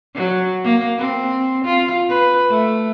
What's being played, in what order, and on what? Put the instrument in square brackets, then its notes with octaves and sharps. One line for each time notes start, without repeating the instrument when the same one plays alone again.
[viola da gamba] F#3
A#3
C4
F4
B4
A3